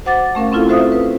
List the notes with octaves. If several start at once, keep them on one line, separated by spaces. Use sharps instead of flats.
F#4 C5 F#5 D6 A6
A3 C#4 A#4 F5
C4 C#4 E4 F4 A4 F5
F#4 A4 C5 E5 F5 D#6
B4